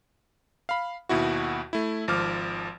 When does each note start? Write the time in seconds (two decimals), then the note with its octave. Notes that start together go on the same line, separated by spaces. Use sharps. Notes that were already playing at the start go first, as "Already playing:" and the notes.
0.69 F5 B5
1.09 D#2 B2 E4 F#4
1.73 A3 E4
2.08 G#1 F3 D6 F6